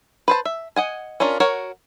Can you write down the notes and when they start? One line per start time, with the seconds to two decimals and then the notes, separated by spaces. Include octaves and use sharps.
0.28 B4 C5 A5
0.45 E5
0.76 D#5 F#5 G#5
1.20 C#4 D4 F4 A#4
1.40 F#4 A#4 C#5 F#5